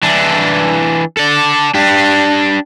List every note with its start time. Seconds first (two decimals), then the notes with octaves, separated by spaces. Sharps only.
0.03 E3 D4
1.17 A4 D5
1.75 D4 G4